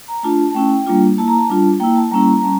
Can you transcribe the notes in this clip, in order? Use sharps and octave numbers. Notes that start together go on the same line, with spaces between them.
A#5
A3 D4 F4 A5
A5
A3 C#4 E4 G5
G3 A#3 D4 F4
A#3 E4 A5
A#5
A5
G3 D4 F4
A#3 E4 G5
A5
G3 A#3 C#4 E4 A#5
A#5
G3 C#4 A5